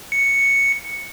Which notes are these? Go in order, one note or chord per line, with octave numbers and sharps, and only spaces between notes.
C#7